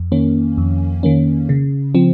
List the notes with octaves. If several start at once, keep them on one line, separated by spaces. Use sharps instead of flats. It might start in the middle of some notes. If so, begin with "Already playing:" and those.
Already playing: F2
D#3 A#3 C#4
F2
D#3 A#3 C#4
C#3
F3 C4